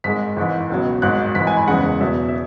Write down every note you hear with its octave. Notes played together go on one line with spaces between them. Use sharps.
G#1 G#2 G#3 B6
G#1 G#2 E3
C#2 B2 F#3
G#1 G#2 F#3 F#6
G#1 G#2 E3 B6
G#5
B5
F#1 E2 C#3 G#3 F#5
E2 B2 F#3 E5
E5